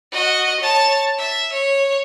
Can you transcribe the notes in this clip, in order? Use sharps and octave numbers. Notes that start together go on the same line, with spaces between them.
F#4 D#5
C#5 A5
E5
C#5